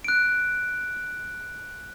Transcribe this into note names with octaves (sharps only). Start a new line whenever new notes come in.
F#6 D7